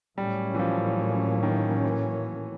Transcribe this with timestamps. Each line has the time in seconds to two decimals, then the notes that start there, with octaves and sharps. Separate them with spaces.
0.18 A2 F#3 G3 A#3 C#4
0.55 E3
0.59 F3
1.43 D#3
1.84 E3